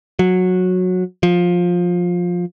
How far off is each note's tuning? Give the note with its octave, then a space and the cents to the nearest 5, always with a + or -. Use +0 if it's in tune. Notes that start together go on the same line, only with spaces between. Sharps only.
F#3 -15
F3 +15